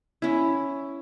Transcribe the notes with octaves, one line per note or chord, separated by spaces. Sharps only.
C#4 E4